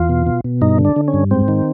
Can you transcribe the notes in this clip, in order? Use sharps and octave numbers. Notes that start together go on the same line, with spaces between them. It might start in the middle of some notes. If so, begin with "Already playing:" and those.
Already playing: E2 F4
B2
B2
B2
G2 D#4
D3
D4
D3
C#4
G2
G#2 C4
D#3